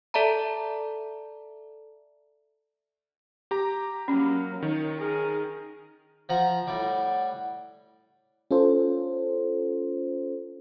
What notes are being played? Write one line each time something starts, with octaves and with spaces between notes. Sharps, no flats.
A4 D5 E5 A5 A#5
G4 A#5
F#3 A#3 C#4
D#3 D#4 C#5
G#4 A#4
F3 F#5 A#5
A2 G3 F#5
C#4 F4 A4 C5